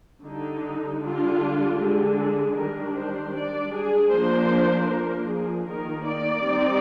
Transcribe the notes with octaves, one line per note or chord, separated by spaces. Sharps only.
D3 G3 D4 D#4
D3 G3 D4 F4
D3 G#3 D4 G4
G#4
D#3 G3 D4 A#4
C5
G3 D4 D5
G#4
F3 A#3 D4 C5
F3 A#3 D4 A#4
G#4
D#3 A#3 D#4 A#4
D5
G3 C4 D#4